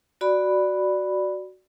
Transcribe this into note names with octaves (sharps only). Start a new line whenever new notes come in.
F#4 D5 B5